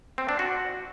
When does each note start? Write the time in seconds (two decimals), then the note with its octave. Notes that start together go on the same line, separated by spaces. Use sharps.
0.18 C4
0.29 D4
0.39 F#4